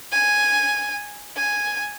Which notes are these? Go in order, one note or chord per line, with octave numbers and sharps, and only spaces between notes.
G#5
G#5